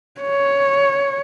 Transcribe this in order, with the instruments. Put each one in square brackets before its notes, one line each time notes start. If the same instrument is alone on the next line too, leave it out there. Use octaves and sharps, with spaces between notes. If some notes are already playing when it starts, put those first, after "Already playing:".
[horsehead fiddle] C#5